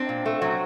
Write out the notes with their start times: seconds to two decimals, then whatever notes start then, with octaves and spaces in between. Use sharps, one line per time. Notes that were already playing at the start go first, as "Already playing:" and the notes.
Already playing: C4 D4
0.09 A#2
0.26 A3
0.42 F#3